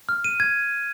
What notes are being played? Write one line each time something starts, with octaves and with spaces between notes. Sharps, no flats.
F6
D#7
G#6